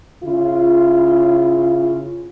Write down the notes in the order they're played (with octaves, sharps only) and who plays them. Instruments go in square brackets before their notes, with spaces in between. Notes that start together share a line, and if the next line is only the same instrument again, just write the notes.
[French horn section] C#3 E4 F4